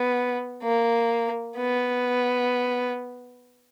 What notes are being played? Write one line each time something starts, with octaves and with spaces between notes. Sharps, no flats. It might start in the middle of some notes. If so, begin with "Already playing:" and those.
Already playing: B3
A#3
B3